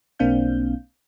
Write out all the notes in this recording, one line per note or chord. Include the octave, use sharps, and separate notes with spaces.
B1 A#3 C4 D4 F5 G6